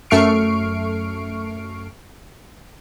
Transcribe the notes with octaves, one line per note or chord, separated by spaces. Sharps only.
F#2 A3 C#6 F6 C7 D7